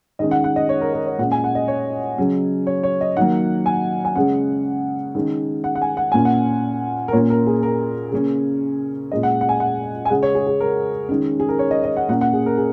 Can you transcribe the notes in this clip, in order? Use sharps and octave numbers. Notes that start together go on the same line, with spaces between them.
D#3 G#3 C#4 D#5
F#5
F#5
D#5
C#5
A#4
A#4
C#5
A#2 G#3 C#4 F#5
G#5
F#5
D#5
C#5
C#3 F#3 C#4
C#5
C#5
D#5
D#3 F#3 A#3 F#5
G#5
G#5
C#3 G#3 C#4 F#5
D#3 G#3 C#4
F#5
F#5
G#5
F#5
A#2 A#3 C#4 G#5
F#5
A#4
A#2 A#3 C#4 C#5
A#4
G#4
A#4
C#3 A#3 C#4
A#2 G#3 C#4 D#5
F#5
F#5
G#5
F#5
G#5
C#3 G#3 C#4 F#5
C#5
G#4
G#4
A#4
D#3 G#3 C#4
G#4
A#4
C#5
D#5
D#5
F#5
A#2 A#3 C#4 F#5
F#5
G#4
A#4
G#4